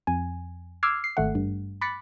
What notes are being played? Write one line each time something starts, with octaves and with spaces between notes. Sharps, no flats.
F2 G#5
D6 E6 F6 G#6 C7
C7
G#1 A3 F#5
G2
B5 D6 F#6 A6 B6 C#7